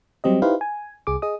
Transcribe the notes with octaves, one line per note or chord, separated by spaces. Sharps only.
F#3 G3 C4 G4 D#5
D#4 E4 G4 B4 C5 F5
G#5
C2 G#4 D6
G#4 D#5 D#6